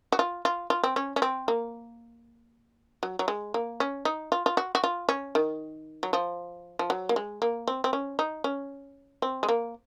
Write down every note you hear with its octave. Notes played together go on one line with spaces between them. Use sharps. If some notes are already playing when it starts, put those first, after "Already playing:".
F#4
F4
F4
F4
C4
C#4
C#4
C4
A#3
F#3
F#3
G#3
A#3
C#4
D#4
F4
F4
F#4
F#4
F4
C#4
D#3
F#3
F3
F3
F#3
A#3
G#3
A#3
C4
C4
C#4
D#4
C#4
C4
G#3
A#3